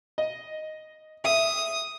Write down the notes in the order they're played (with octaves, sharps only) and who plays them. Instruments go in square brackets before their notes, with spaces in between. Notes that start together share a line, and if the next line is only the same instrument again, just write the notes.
[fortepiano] D#5
[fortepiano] E5 [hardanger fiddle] D#6